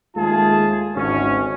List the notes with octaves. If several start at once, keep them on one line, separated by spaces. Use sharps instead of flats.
D#2 G#3 A3 F4 G#4 A5
G#1 D2 C#4